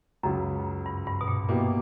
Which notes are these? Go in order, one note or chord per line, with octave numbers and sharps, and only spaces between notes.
C#2 F#2 C#3 F#3
G2
G2
B2
A#2
B2 A#3 E4 G4